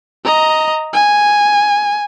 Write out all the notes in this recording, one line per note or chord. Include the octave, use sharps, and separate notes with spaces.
D#5 A#5
G#5